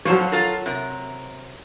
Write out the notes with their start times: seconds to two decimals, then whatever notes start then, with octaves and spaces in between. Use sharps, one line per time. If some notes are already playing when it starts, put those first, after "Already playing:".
0.05 F2 F3 F#3 C5 C#5
0.32 F4 A4 A#4
0.66 C3 A#4